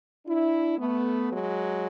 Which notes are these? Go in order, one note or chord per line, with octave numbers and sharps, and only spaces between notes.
D4 E4
A3 B3
F#3 G#3